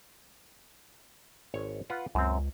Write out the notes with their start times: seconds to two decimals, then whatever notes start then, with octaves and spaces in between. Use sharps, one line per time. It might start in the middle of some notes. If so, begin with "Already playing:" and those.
1.54 G#1 C#5
1.90 F4 B4 F#5
2.15 C#2 F#2 C4